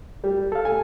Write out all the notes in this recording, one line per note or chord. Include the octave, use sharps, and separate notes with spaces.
G3
A4 F5
G#5